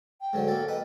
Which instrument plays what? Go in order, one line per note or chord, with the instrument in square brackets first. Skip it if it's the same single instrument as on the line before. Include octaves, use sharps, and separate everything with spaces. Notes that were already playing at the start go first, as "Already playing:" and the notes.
[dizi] G5
[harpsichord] G#2 D3 F#3
A#3 A4
[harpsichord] B4 [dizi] D#5